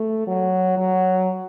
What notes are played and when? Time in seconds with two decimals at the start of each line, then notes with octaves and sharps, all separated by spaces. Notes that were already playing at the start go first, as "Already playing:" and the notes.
Already playing: A3
0.27 F#3
0.77 F#3